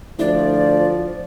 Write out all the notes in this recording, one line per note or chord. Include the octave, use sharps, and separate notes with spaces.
D2 F3 E4 D5